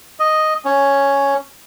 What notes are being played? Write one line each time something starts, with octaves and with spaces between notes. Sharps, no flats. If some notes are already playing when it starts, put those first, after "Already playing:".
D#5
C#4